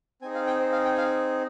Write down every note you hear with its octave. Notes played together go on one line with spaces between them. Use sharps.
C4 D#4 G#4 G#5
F5
G5
C5
F5
G5
F5